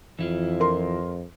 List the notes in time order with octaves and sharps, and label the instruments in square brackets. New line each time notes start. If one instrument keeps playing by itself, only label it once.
[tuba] F2 [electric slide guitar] E3 E4 F4
[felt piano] A#4 C6